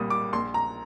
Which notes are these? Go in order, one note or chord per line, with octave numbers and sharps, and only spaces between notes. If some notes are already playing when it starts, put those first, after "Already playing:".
Already playing: C2 A#2 G3 A#3 D#6
D6
A#1 C6
A#5